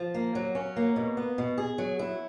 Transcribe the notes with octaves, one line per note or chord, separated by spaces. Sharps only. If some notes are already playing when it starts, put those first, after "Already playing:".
Already playing: F3
A#3
F#3
C#4
A#3
B2
B3
B2
G#4
F#3
E4